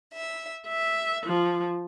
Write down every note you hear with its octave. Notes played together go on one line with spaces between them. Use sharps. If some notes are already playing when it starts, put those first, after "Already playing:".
E5
E5
F3